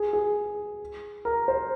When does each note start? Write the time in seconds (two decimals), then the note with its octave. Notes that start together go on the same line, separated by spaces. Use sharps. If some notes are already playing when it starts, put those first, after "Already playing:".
Already playing: G#4
0.13 G#4
1.25 A#4
1.48 C5